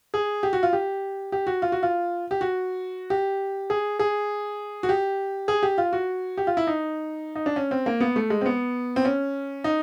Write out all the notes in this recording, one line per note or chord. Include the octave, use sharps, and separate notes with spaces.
G#4
G4
F#4
F4
G4
G4
F#4
F4
F#4
F4
G4
F#4
G4
G#4
G#4
F#4
G4
G#4
G4
F4
F#4
G4
F4
E4
D#4
D#4
D4
C#4
C4
A#3
B3
A3
G#3
C4
B3
C4
C#4
D#4